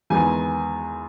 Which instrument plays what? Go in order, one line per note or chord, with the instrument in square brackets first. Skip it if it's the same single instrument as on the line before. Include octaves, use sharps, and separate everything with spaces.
[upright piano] E2 D#3 G#3 B3 G#5